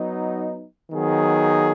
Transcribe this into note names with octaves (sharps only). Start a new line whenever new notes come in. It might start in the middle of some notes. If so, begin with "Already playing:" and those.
Already playing: F#3 B3 D#4
D#3 F#3 B3 D#4 G#4